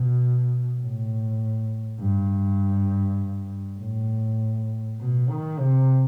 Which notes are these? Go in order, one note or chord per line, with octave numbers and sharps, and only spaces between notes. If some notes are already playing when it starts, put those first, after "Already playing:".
Already playing: B2
A2
G2
A2
B2
D#3
C3